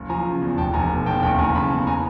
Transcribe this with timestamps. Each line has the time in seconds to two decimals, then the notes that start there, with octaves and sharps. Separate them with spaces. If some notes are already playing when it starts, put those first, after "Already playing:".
Already playing: F#1
0.09 F3 G#5 A#5
0.26 C#3
0.42 E2
0.58 F1 G5 A5
0.74 F1 G#5 A#5
0.90 B2
1.06 E2 G5 A5
1.23 F#1 G5 A5
1.38 F#1 G#5 A#5
1.55 C#3 A5 B5
1.71 E2
1.87 G#5 A#5